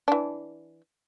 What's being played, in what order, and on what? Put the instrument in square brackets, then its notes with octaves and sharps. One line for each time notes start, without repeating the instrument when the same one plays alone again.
[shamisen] E3 D4